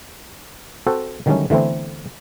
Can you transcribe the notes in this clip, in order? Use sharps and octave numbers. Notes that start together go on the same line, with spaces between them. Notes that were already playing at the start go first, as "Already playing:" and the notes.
C4 F#4 A4 C5
D3 D#3 F#3 G3 A3 C#4
D3 E3 A3 B3 C4